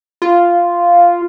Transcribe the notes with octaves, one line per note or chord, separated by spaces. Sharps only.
F4